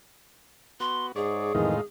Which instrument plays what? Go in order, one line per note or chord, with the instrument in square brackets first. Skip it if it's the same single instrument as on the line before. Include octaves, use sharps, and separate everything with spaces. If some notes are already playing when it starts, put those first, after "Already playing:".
[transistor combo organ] B3 F#4 [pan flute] C6
[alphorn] G#2 [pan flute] G#4 [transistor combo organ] C#5 D5
[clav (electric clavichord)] F2 D#3 E3 [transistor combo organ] A2 D#4 F4 [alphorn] G#3